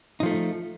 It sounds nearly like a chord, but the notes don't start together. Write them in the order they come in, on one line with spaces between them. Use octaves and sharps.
D#4 F3 A3